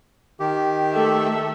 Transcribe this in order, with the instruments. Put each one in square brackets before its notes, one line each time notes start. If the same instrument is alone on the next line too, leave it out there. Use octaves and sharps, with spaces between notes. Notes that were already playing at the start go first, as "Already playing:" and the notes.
[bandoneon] D#3 G4
[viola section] A3 A4 E5